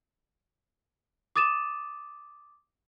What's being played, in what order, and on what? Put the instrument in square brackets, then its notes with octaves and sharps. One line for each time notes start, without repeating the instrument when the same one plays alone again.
[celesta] D6 D#6 A6 D#7 E7